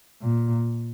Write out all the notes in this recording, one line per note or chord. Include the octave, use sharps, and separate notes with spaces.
A#2